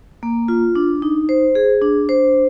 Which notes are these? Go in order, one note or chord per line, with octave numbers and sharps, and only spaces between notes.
A#3
F4
D4
D#4
C5
G#4
D4
C5